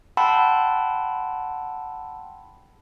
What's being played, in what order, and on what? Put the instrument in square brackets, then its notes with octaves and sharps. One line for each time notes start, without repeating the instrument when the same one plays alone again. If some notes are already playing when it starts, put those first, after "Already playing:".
[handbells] F#5 G5 A5 B5 C6 E6